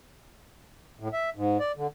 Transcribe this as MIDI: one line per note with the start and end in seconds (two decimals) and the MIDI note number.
1.00 1.08 45
1.13 1.30 76
1.36 1.57 44
1.60 1.72 74
1.76 1.87 50